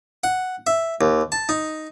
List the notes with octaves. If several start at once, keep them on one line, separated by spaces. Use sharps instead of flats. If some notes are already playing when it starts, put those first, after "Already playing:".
F#5
E5
D#2
A5
D#4